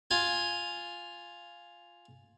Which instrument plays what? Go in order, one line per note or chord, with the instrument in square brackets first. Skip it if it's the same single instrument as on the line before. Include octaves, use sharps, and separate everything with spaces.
[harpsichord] F4 G#5